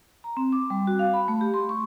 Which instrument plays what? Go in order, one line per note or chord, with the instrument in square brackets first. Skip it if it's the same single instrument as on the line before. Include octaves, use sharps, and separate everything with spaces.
[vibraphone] A#5
C4
D6
G3
F#4
F5
B5
A3
G4
C6
C#6